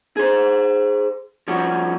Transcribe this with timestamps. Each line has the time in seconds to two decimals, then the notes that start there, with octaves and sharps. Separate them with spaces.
0.17 G#4 C5
1.48 F3 G3 C#4 F#4